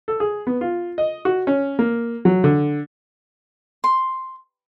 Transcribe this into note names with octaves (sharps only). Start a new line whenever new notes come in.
A4
G#4
B3
F4
D#5
F#4
C#4
A#3
F#3
D3
C6